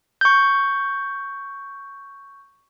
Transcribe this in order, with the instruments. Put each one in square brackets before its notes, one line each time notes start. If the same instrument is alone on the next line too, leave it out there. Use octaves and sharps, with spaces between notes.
[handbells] C#6 G6